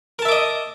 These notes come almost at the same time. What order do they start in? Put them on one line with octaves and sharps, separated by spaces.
A#4 A5 E5 D6 D#5